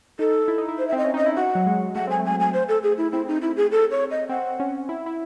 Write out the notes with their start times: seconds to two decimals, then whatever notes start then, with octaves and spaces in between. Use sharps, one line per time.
0.19 D#4 A4
0.48 E4
0.58 D#4
0.69 E4
0.78 C5
0.88 E5
0.92 C4
0.98 D#5
1.04 C#4
1.14 D#4 D#5
1.26 E4
1.36 F#4 F#5
1.55 F#3
1.66 G#3
1.95 A3 F#5
2.07 C4 G#5
2.19 A3
2.25 G#5
2.40 G#5
2.53 C5
2.68 A4
2.83 G#4
2.98 E4
3.12 C4 E4
3.28 D#4
3.41 E4
3.57 G#4
3.72 A4
3.91 C#5
4.11 D#5
4.29 C4 F#5
4.60 C#4
4.89 E4
5.06 E4